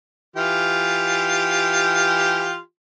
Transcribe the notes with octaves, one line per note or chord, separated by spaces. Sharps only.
E3 F4 G4